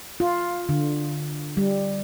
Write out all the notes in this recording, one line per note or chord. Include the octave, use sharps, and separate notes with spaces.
F4
D3
G3